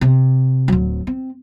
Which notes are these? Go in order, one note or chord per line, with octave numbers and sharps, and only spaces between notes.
C3
D1 F#3
C4